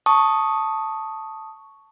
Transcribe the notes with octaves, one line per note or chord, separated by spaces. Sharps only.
A5 C#6 D#6